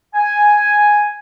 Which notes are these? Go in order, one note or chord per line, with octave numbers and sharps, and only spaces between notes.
G#5